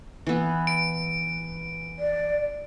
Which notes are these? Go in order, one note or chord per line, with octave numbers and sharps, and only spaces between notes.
E3 B3
D7
D5